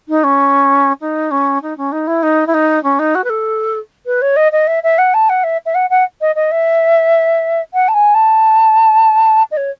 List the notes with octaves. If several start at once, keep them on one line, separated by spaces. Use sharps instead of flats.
D#4
C#4
D#4
C#4
D#4
C#4
D#4
E4
D#4
E4
D#4
C#4
D#4
F#4
B4
A4
B4
C#5
D#5
D#5
E5
E5
F#5
A5
F#5
E5
E5
F#5
F#5
D#5
D#5
E5
F#5
A5
G#5
A5
D#5
C#5